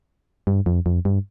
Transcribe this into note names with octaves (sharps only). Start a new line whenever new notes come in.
G2
F2
F2
G2